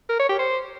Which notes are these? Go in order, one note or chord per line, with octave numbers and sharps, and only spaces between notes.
A#4
C#5
G4
C5